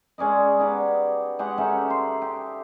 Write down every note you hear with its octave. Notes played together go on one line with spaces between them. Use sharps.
G#3 C#4 D5 D#5
B3 D#4 G4 D5
G#3 G4 F#5 C#6
C#4 D#4 A4 E5
C6
G4